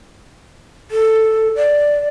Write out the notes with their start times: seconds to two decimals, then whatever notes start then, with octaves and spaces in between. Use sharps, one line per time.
0.91 A4
1.56 D5